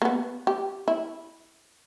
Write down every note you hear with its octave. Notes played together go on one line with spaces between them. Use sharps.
A#3
B3
G4
E4